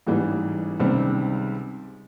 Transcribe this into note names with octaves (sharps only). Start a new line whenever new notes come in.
A1 G#2 E3 G3
C#2 C3 D#3 G3 C4